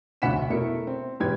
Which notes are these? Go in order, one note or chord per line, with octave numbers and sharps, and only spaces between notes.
F1 D2 F#5 B5 B6 E7
B2 A3 E4 A#4 C#7
C4
E1 G#2 G4 B4 G#6